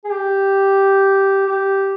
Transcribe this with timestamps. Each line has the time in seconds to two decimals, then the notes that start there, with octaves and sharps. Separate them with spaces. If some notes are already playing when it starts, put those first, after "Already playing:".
0.05 G#4
0.12 G4
1.46 G4